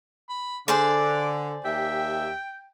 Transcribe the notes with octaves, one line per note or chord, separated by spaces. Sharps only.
B5
D3 G#4 C5 D5 D6
D#2 G4 E5 G5